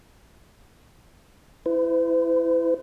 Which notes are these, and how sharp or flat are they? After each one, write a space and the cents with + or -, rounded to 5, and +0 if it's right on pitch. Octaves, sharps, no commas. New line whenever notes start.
E4 +5 B4 +45